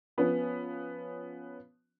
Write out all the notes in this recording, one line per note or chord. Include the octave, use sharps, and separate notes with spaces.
F3 B3 C#4